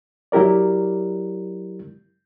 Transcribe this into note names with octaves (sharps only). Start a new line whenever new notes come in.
F#3 E4 G4 A#4 D5